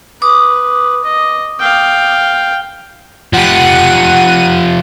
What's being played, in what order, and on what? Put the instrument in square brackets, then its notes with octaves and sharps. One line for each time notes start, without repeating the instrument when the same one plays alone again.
[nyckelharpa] B4 [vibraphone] D6 D#6
[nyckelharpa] D#5
F5 G5
[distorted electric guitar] F3 G4 [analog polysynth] F#5 D#7